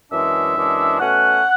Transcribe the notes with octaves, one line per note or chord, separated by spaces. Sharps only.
F#2 E3 G#3 D4 E5
F#2 E3 G#3 D4
B2 A3 C#4 F#5